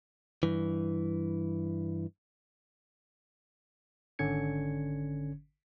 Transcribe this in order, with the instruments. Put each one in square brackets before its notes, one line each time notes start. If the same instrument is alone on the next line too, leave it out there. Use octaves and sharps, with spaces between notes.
[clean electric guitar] G2 E3
[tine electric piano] G#1 D3 C#4 G#6 C#7